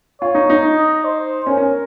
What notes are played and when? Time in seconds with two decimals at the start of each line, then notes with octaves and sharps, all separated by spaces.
0.21 F4 C#5
0.35 D#4
0.50 D#4
0.64 D#5
1.05 C5
1.47 C#4 A#4
1.57 C#4